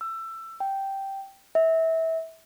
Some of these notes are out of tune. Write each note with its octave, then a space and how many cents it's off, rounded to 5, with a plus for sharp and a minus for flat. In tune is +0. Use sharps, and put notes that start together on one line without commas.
E6 +20
G5 -5
E5 -25